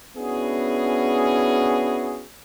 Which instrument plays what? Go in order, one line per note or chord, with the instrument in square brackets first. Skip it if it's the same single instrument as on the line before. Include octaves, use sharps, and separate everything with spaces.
[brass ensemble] B3 C#4 D4 E4 F#4 G#4